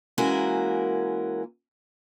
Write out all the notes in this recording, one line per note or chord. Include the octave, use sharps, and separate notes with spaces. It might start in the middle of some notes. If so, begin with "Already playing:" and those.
E3 G#3 A#3 C#4 F#4 A#4